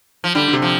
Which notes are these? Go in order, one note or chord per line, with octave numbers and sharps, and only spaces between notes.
F3
D3 G3
D3
C3
F3